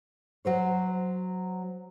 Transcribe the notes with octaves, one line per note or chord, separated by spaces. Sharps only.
F#3 C5 C#5